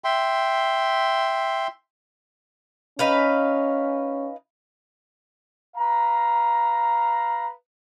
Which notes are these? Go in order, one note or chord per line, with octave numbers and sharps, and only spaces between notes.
E5 G5 C6
C#4 D#4 B4 F5
B4 F5 A#5